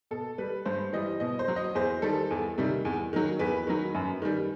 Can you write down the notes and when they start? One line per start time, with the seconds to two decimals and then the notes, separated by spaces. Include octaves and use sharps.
0.11 B2 A4
0.38 G3 B4
0.65 G2 C5
0.93 E3 G3 D#5
1.20 B2 D#5
1.39 C5
1.48 F#3
1.56 D#5
1.75 E2 C5
2.02 D#3 G3 A4
2.31 E2
2.58 C3 D#3 G3
2.85 E2
3.13 D#3 F#3
3.39 E2 B4
3.67 D#3 F#3
3.94 F#2
4.22 D#3 G3